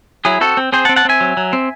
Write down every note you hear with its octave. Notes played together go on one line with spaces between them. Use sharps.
F#3 E4 G#4
C4 F#4 A4
C4
C4 G#4 C5
F#5 A5
C4
F#5 A5
C4 E5 G#5
F#3
F#3
C4